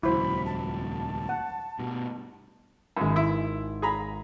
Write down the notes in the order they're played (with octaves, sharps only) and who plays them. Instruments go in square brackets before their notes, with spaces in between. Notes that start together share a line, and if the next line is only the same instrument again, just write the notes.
[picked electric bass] D#1 C#2 F#3 [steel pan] E4 C5 [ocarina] B5
[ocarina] A5
[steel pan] F#5
[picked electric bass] G2 B2
[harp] G#1 B5 [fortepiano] F#2 G#3
[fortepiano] E4 E5 [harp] C6
[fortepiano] G#4 A#5 B5